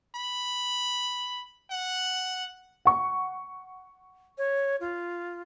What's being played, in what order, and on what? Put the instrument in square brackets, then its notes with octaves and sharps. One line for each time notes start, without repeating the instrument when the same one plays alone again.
[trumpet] B5
F#5
[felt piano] F#5 C#6
[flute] C#5
F4